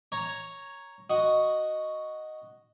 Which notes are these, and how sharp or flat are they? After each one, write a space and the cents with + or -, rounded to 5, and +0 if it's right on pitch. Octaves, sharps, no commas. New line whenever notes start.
C#5 +0 A#5 +0
F#4 +0 D#5 +0